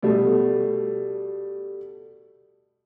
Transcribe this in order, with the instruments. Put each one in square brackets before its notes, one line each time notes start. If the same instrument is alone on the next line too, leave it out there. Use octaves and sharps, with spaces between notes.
[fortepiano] B2 G3 A3